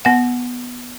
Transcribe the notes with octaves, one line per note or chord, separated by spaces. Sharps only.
B3 F#5